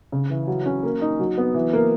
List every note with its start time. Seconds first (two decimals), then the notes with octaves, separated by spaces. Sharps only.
0.12 C#3
0.30 E3
0.47 F#3
0.66 C#4
0.83 A#3
1.01 D#4
1.19 F#3
1.38 B3
1.54 E3
1.73 A#3